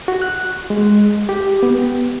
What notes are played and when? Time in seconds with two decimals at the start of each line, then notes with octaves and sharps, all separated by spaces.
0.08 F#4
0.22 F#6
0.70 G#3
1.29 G4
1.63 B3